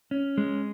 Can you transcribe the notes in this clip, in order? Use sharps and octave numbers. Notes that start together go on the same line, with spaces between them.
C#4
G#3